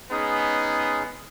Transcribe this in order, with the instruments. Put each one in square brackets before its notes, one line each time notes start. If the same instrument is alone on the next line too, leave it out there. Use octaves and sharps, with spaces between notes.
[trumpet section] G#3 B3 [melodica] C#4 D#4 G#4